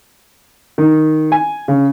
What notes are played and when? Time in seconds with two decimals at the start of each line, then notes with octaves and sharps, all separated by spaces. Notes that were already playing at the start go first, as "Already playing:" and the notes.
0.78 D#3
1.32 G#5
1.68 C#3